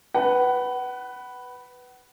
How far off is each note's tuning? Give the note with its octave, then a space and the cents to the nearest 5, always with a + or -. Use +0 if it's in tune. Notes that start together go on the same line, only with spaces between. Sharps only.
B4 +0 F#5 +30